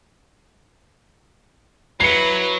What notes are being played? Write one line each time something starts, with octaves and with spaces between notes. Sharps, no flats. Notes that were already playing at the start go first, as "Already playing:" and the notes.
F#3 E4 B4 C7 C#7